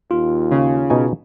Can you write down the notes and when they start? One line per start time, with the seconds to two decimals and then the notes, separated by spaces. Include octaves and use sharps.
0.11 D#2 F4
0.51 C#3
0.90 B2 D#4 G#5